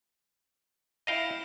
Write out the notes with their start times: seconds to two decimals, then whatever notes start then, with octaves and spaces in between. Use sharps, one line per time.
1.07 E4 D#5 F5 G5